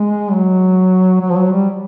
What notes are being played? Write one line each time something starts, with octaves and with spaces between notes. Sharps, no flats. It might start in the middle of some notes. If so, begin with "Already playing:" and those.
Already playing: G#3
F#3
F#3
F3
F#3
G3